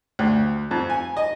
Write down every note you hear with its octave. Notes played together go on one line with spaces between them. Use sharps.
D2
F2
G#5
D#5